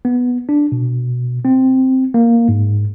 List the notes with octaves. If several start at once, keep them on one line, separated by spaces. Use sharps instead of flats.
B3
D4
B2
C4
A#3
G#2